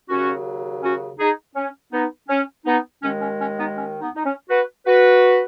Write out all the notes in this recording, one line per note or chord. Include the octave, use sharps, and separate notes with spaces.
D#2 C#3 F#3 C#4 F#4
C#4 F#4
D#4 G#4
C#4
B3 D#4
C#4
B3 D#4
D#2 D#3 G#3 C#4
C#4
C#4
B3 D#4
C#4
B3 D#4
D#4
C#4
F#4 B4
F#4 B4